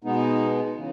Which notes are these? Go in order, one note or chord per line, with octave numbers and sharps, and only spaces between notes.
B2 G#3 B3 D#4
C#3 E3